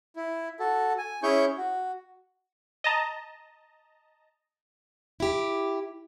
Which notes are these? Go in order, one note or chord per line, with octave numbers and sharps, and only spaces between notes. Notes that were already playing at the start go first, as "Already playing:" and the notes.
E4
F#4 A4
G#5
C#4 E4 G#4 C#5 C#6 G6
F#4
D#5 A5 A#5
E4 G4